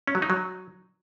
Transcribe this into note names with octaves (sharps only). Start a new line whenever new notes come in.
C#4
F#3
D#4
F#3